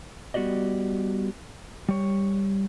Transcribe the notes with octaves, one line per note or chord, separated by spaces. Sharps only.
G3 B3 F#4 G4 D5 D#5
G3 C#5